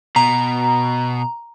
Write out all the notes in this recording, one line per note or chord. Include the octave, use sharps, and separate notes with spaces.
B2 A#5